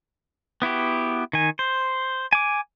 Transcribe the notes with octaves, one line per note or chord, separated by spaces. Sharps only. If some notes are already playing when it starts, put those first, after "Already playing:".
B3 E4 F#4 G4
D#3 G#5
C5
G#5 D6